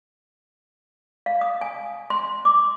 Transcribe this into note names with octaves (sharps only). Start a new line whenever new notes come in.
F5
D#6
G#5
C6
D6